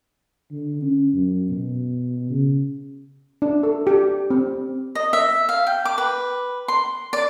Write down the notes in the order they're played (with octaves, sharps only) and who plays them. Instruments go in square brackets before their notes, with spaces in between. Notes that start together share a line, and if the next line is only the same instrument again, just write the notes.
[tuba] D3
C#4
F#2
B2
C#3
[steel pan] D4
A4
G4
C4
[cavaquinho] D#5
E5
F5
G5
D6
B4
C6
D5